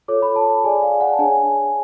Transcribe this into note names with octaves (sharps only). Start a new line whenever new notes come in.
F4 A4 C#5 D6
B5
A5
A5
G#4 D5 G#5
F5
F#5
A5
D4 G#4 C#5 G#5